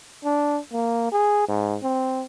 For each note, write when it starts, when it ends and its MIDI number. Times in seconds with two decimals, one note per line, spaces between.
0.24 0.59 62
0.73 1.10 58
1.12 1.46 68
1.48 1.77 44
1.82 2.25 60